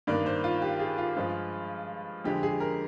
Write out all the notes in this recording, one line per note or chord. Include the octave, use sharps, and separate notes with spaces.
G2 D#3 A#3 D5
C5
F4
G4
G#4
F4
G2 F3 G#3
F2 D3 G#3 G4
G#4
A#4